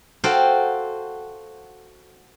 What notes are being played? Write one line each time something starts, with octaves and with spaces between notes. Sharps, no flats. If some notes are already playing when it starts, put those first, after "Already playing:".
F#4 A4 C5 F5 G5